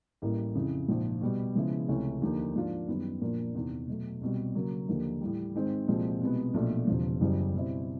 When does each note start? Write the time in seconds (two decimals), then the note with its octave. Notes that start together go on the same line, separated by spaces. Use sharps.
0.22 A1 A2 E3 G3 A#3
0.55 F2 C#3 E3
0.88 A#1 G#2 F3
1.21 B2 G3 B3
1.55 C#3 F3 G#3 B3 E4
1.88 C#2 C3 E3 A3 C#4
2.22 D#2 D3 F3 A#3 D#4
2.55 G#2 F3 A#3 D4 F4
2.88 F#2 D#3 G3 B3
3.21 A#2 F3 A#3 D4
3.55 E2 C3 D#3
3.88 B2 F#3 A3
4.21 C2 B2 G3
4.55 C#3 F#3 A#3
4.88 D#2 D3 F3 A#3 D#4
5.21 A2 E3 G3
5.54 G#2 D#3 G#3 C4
5.88 C2 A#2 F3 G#3 C4
6.21 C2 B2 G#3 B3
6.54 B1 A#2 F3 A3 D4
6.87 E1 E2 C#3 F3
7.21 F#1 F#2 C#3 E3 G3
7.54 B2 G3 C4 E4